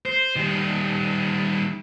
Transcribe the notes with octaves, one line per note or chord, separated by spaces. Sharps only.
C5
D#3 G3